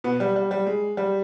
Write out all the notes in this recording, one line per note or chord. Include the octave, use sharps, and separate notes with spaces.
B2 B3
G3
G3
G3
G#3
G3